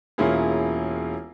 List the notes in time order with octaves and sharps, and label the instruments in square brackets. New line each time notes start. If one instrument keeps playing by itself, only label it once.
[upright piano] E1 A#3 C#4 E4 F4 G#4